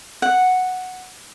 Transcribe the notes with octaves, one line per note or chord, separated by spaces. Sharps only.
F#5